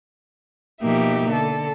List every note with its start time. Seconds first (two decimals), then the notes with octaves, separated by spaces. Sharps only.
0.82 B2 F3 A#3 D#4 G4 E5
1.29 D3 A4